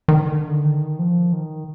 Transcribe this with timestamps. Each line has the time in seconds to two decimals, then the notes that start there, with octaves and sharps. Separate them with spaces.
0.08 D#3
0.31 D3
0.64 D#3
0.99 F3
1.33 D#3